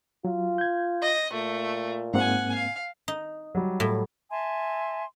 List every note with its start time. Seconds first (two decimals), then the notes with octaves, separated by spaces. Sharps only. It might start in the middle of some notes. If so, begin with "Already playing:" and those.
0.25 F#3 F4
0.58 G6 G#6
1.02 D#5
1.33 A#2 A3
2.14 G#2 A#3 C4 F#5 G#5
2.54 F5
3.08 D#4
3.55 F#3 G3
3.80 A2
4.31 E5 G#5 A5 C6